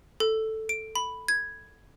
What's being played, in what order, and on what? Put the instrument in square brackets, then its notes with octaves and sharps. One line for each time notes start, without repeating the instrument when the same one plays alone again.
[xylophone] A4
D7
B5
G#6